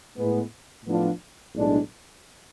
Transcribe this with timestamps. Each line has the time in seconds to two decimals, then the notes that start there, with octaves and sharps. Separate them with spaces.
0.17 A2 G#3 B3
0.85 A2 F3 B3 D4 F4
1.54 B1 A2 G#3 D4